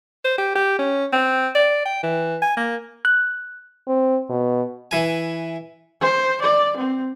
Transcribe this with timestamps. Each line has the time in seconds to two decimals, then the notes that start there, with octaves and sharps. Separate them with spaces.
0.24 C5
0.38 G4
0.55 G4
0.79 C#4
1.13 C4
1.55 D5
1.85 G5
2.03 E3
2.42 G#5
2.57 A#3
3.05 F#6
3.88 C4
4.29 B2
4.91 E3 G#5
6.01 C5
6.42 D5
6.77 C4